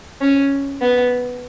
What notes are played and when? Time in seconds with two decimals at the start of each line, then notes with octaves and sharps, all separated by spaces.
0.21 C#4
0.82 B3